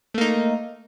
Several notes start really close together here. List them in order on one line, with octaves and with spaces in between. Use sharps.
A3 A#3 D#4